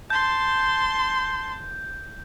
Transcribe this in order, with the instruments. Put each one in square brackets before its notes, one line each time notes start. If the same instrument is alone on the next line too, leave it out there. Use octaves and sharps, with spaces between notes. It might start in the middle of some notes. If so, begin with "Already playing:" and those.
[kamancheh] A5 C6 [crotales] G6